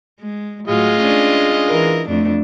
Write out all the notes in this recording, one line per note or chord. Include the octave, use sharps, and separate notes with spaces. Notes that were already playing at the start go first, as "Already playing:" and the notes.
G#3
A2 F#3 G#3 F4 D#5
C#4 D4
E3 A#4
F2 A3 D4